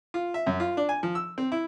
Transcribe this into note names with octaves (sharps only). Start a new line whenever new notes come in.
F4
E5
F#2
F4
D4
G#5
F3
E6
C4
E4